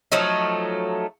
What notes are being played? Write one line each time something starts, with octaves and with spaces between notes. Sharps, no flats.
F3 F#3 A3 D#4